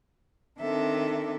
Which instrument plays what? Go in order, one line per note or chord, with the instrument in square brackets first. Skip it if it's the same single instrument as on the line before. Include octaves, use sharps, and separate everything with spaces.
[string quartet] D#3 C4 D4 A4 E5